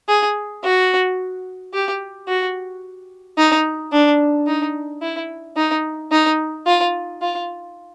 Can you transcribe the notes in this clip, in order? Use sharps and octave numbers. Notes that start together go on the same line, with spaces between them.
G#4
F#4
G4
F#4
D#4
D4
D#4
E4
D#4
D#4
F4
F4